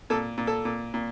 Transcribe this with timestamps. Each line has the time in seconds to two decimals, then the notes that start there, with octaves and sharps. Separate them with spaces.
0.10 A#2 A4
0.38 A#2
0.47 A4
0.65 A#2
0.94 A#2